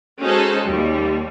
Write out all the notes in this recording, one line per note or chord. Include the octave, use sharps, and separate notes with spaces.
G#3 C#4 D#4 F#4 A4 C5
D#2 G3